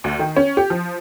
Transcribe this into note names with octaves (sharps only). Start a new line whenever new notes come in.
D2
D#3
C#4
G4
F3